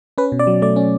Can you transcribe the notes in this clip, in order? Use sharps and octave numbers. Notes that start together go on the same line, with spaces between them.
C#4 B4
B2
D5
F#3
A3 D5
C#4